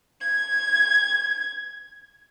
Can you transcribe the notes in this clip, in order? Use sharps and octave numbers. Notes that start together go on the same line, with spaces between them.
G#6